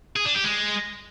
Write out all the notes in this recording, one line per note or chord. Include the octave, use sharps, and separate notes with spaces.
G#4
D4
G4
G#3